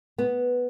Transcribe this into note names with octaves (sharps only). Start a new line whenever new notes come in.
B3